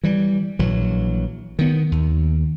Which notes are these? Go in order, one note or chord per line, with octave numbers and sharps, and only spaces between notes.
E3 G3
A#1 E3 F#3
D#3 B3
D#2